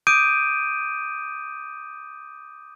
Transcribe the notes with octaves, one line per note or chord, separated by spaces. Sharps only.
D6 D#6 G6 D7 D#7